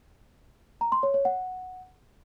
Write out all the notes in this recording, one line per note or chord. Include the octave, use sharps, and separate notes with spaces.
A#5
C6
C#5
C#5
F#5